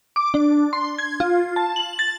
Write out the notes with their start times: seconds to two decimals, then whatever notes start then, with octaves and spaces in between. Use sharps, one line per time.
0.16 D6
0.34 D4
0.73 C6
0.99 G#6
1.20 F4
1.56 A5
1.76 F#7
1.99 A6